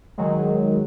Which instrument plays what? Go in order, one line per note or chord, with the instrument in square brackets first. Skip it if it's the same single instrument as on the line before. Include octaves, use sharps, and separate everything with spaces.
[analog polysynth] D#3 F#3 G#3